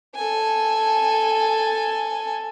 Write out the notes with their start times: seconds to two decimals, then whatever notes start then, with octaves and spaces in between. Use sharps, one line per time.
0.15 A4 G#5